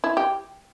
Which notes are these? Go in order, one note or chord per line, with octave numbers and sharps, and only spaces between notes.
E4
G4